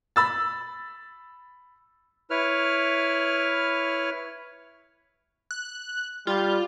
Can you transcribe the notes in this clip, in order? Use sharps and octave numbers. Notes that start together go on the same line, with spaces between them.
B5 E6 A6
E4 B4 C#5 F6
F#6
G3 F4